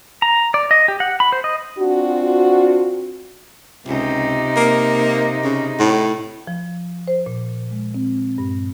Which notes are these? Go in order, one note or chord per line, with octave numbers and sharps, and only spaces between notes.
A#5
D5
D#5
G4
F#5
B5
C5
D#5
C4 D4 F4 F#4
C#2 C3 D#4
A#3
C#3
A2
F3
C5
A#2
G#3
C4
G2